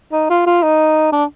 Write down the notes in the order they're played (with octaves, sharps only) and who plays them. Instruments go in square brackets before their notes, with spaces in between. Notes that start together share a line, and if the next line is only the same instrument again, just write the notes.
[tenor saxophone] D#4
F4
F4
D#4
D4